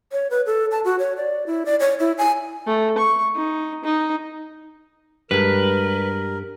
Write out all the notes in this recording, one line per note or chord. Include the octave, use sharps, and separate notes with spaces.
C#5
B4
A4
A5
F#4
C#5
D5
E4
D5
C#5
E4
G#5
A3
C#6
D#4
D#4
G2 G3 G#3 A#4 B4